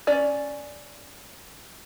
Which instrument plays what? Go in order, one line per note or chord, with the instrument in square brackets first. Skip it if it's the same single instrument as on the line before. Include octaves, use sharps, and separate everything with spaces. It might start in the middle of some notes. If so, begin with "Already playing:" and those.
[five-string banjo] C#4 D5